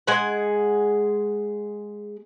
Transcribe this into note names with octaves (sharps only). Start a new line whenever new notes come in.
G#3 G#4 F#5